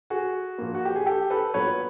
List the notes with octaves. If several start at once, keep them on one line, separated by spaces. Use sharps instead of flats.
F#4 G#4
A#2 F3 A#3
F#4
G4
G#4
G4 A4
A4 B4
A#2 F#3 B3 B4 C#5